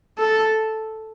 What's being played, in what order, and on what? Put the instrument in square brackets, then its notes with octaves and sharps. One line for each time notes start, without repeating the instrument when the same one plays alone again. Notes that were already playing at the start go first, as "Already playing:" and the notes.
[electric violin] A4